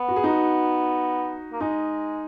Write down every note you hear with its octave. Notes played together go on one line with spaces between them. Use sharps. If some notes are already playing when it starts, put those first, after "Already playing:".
Already playing: B3
F#4
G#4
D#4 F#4
A#3
G#3 D#4